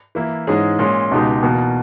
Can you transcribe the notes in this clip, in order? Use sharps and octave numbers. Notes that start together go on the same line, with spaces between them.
E3 A#3 E4
G#2 E3 G#3 C#4 G#4
A#2 G#3 C#4
C#2 B2 G#3 D#4 G4
E2 B2 A#3